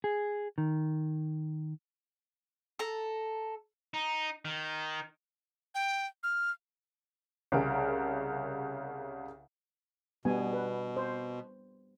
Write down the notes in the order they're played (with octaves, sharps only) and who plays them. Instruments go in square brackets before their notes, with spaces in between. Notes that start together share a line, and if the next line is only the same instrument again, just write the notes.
[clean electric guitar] G#4
D#3
[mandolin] A4 A#5
[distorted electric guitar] D#4
D#3
[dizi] G5
F6
[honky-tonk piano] C2 C#3 A#4 D7
[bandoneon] B2 [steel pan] G3 B3 G#5
[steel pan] B4
C5